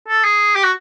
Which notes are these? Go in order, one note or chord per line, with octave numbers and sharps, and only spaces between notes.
A4
G#4
G4
F#4